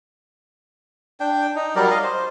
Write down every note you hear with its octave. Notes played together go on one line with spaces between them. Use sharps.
D4 G5
D#4
F#3 G3 A#4 D5
D#5 F5
C5